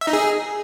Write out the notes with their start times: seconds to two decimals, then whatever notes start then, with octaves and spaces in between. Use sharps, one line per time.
0.01 E5
0.07 D#4
0.13 G#4